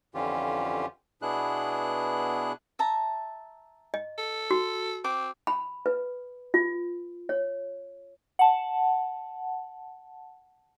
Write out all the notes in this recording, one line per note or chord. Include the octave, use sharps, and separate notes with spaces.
F2 D3 E3 C#4 F4 G4
B2 B3 D4 E4 G#4 F#6
E5 A5 A#5
D#5
A4
F#4
C4 D6
B5
B4
F4
C#5
F#5 A5